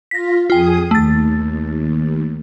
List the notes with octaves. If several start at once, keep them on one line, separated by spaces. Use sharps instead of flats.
F4 A#6 B6
F2 F4 G#4 G5 D#6
D#2 A3 A6